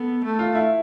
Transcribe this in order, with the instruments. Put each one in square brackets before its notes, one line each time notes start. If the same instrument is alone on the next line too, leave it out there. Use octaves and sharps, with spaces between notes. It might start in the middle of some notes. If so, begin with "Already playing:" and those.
Already playing: [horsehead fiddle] B3 [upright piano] A4
[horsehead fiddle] A3
[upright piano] F4
E4